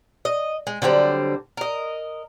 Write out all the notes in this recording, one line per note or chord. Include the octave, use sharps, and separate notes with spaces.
D#5
G#3
D3 F#3 G3 C4
A#4 D#5